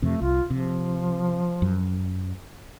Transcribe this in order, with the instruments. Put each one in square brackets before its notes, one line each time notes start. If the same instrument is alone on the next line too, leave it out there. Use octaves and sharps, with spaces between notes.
[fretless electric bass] F2 C3 [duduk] A3
[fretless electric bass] C2 [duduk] F4
[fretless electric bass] C3 [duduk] F3
[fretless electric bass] F#2